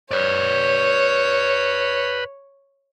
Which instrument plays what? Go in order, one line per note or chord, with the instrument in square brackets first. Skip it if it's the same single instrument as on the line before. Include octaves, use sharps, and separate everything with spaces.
[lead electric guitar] B4 D5 [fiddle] C#5